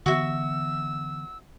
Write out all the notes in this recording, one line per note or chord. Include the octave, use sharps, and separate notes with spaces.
D3 E3 B3 F#4 E5 E6